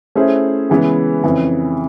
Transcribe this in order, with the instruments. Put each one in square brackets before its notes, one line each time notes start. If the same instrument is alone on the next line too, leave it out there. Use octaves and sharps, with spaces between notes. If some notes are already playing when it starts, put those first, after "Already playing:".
[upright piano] A3 C#4 E4 G#4 C5
C#3 E3 G#3 B3
F2 C#3 E3